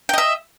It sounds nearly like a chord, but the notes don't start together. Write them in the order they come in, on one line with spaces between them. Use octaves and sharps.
G5 D#5 E5